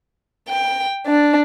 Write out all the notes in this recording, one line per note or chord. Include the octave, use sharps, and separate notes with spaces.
G5
D4